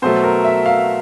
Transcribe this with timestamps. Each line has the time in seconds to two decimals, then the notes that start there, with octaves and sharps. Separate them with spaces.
0.02 B2 F#3 A3 C5
0.24 A#4
0.45 E5
0.66 F5